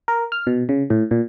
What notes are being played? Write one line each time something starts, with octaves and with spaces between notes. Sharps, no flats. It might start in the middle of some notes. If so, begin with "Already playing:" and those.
A#4
F6
B2
C#3
A2
A#2